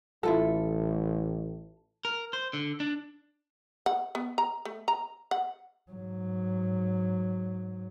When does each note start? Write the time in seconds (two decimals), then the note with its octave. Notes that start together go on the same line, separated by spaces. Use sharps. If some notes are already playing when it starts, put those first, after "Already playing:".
0.23 A1 E4 F4 A4
2.05 A#4
2.33 C5
2.53 D3
2.80 D4
3.86 F#5
4.15 B3
4.38 A#5
4.65 A3
4.88 A#5
5.31 F#5
5.91 G#2 F#3